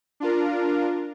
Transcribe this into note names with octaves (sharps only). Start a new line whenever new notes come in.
D4 F4 A#4